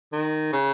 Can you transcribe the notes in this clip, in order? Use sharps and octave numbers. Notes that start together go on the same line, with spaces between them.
D#3
C#3